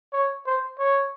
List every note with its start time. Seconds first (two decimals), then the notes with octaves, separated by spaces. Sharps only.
0.13 C#5
0.46 C5
0.79 C#5